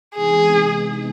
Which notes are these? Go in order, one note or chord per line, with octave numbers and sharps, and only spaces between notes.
C3 E3 G#3 B3 D#4 G#4